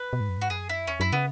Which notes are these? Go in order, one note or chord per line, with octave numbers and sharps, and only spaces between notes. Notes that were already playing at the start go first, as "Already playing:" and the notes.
Already playing: B4
B2
G#2
F#2
G#2 F#4
F#2 G#4
E4
E2 C#4
F#2 E4
C#3 B3